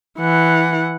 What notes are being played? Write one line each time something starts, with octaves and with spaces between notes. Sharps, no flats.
E3 F#5